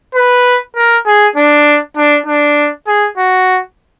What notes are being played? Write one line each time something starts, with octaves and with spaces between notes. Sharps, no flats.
B4
A#4
G#4
D4
D4
D4
G#4
F#4